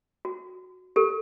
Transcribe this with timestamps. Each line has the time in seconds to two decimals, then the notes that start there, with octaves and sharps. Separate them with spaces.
0.25 F#4
0.96 G4 A4